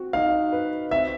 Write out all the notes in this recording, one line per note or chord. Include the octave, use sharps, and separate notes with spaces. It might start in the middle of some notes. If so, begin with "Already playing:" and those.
Already playing: C4 F#4
D#4 F5
B4
C4 E5